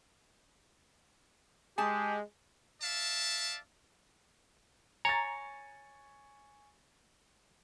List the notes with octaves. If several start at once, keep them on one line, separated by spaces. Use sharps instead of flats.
G#3 G4 G#4 G#5 A5
D5 E5 F5 A5
C#5 G#5 A#5 C#6 A6